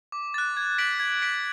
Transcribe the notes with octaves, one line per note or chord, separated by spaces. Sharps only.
D6
F#6 A6
G#6
B6 D7 F#7
G#6
B6 D7 F#7